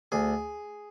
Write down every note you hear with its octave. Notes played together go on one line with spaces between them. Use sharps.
D2 G#4